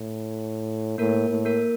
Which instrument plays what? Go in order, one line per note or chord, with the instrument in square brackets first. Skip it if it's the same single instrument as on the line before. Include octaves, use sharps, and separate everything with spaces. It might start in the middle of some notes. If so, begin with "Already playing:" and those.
Already playing: [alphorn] A2
[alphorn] A2 [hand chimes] A#3 A#4
[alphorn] A2
[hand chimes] A#3 A#4